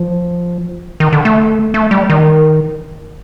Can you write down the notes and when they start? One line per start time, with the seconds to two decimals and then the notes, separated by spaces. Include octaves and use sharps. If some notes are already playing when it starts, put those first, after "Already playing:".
Already playing: F3
1.00 D#3
1.13 D3
1.25 A3
1.74 A3
1.91 G3
2.10 D#3